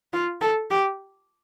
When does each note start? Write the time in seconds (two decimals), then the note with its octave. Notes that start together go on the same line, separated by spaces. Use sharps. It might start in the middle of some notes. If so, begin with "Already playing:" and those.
0.13 F4
0.41 A4
0.71 G4